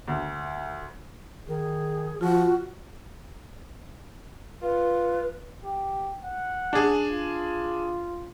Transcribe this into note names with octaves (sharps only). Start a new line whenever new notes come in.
D2
D#3 G#4
F3 F4 F#4
F4 B4
G4
F#5
D4 G#4
F4